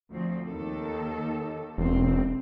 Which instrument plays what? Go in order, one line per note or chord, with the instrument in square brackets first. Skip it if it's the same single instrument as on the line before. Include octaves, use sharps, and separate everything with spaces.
[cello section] D2 F3 C4
D#2 D#3 A4
[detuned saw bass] E1 [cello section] C4